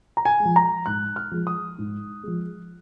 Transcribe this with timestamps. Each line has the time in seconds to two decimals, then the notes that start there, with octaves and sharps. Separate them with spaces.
0.17 A#5
0.25 G#5
0.40 G#3
0.45 F3
0.56 A#5
0.86 G#2 F#6
1.16 F6
1.31 F3 G#3
1.47 D#6
1.78 G#2
2.23 F3 G#3